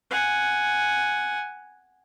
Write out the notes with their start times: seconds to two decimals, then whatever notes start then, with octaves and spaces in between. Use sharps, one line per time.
0.11 F#5 G#5